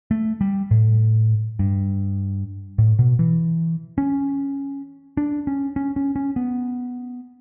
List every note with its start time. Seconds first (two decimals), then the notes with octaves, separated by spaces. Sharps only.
0.11 A3
0.41 G3
0.71 A2
1.59 G2
2.78 A2
2.99 B2
3.19 E3
3.98 C#4
5.17 D4
5.47 C#4
5.76 C#4
5.96 C#4
6.16 C#4
6.36 B3